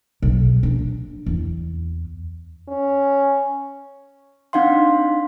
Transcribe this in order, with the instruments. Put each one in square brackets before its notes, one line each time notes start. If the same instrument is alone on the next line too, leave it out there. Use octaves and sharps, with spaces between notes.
[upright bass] B1
D4
E2
[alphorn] C#4
[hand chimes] C4 D4 D#4 F5 F#5 C6